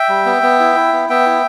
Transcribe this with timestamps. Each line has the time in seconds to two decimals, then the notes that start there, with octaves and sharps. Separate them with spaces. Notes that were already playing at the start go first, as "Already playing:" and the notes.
Already playing: E5 G5
0.09 G3
0.26 B3
0.43 B3
0.60 E4
0.75 E4
0.92 B3
1.09 B3 E5 G5
1.26 E4